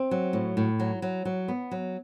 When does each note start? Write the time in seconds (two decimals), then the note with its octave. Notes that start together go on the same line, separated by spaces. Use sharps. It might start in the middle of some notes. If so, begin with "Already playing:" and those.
Already playing: C4
0.11 F#3
0.33 A2
0.57 A2
0.80 F#3
1.02 F#3
1.25 F#3
1.48 B3
1.71 F#3